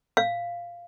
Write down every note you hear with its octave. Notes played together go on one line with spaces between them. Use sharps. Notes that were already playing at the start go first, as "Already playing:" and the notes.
F5